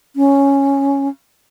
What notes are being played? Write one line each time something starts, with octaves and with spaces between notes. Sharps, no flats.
C#4